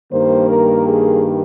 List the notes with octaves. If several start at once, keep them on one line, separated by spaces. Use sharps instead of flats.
G2 D#3 G3 A#3 C5
A#4
G#4